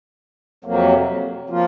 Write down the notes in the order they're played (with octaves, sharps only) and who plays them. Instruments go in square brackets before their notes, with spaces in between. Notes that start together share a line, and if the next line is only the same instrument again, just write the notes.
[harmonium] F2 C3 F#3 A#3
F3 A#3 F4